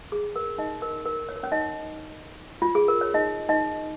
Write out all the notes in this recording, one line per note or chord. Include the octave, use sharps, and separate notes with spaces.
G#4
A#4
D#4 D#5
A#4
A#4
C#5
A#4
C#4 C#5
D#4 D#5
F4
G#4
A#4
C#5
D#4 D#5
D#4 D#5